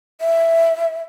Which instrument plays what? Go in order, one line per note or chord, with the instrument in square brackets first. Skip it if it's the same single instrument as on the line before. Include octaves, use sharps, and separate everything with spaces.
[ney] E5